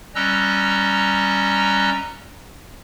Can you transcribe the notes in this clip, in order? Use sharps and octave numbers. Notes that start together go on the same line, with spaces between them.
G3 C#4 D#5 A#5 E6 F#6